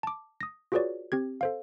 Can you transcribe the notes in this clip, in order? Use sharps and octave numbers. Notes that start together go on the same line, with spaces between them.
A5 D6
D#6 A#6
F4 F#4 G#4 B4 C#5 D5
C4 G4 G#6
A4 C5 F5